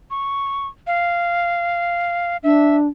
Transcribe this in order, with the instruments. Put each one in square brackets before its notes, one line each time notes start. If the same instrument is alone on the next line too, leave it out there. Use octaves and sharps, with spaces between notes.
[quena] C#6
F5
[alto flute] D4 [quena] E5